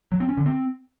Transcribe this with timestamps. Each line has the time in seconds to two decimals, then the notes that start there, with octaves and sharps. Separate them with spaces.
0.12 F#3
0.20 C4
0.29 C#4
0.37 D3
0.46 C4